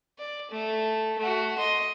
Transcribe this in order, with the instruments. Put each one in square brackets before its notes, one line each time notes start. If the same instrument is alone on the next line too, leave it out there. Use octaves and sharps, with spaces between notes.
[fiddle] D5
A3
A3 F#4
D#5 C6